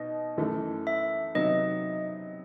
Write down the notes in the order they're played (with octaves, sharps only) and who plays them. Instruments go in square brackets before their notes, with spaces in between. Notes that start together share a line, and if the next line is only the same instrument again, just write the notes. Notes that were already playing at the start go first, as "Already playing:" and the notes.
Already playing: [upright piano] B2 D#4 [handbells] D#5
[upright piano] F#2 E3 A3
[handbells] E5
[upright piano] C3 F#3 B3 D#4 [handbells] D#5